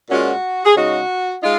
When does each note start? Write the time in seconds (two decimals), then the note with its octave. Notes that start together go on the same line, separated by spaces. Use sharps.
0.09 A#2 G#3 C#4 F4 F#4
0.65 G#4
0.76 C#3 G#3 D#4 F#4
1.42 G#3 D#4 F4